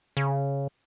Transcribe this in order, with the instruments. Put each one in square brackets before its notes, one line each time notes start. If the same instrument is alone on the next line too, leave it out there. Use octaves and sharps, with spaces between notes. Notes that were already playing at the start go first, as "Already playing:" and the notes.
[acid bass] C#3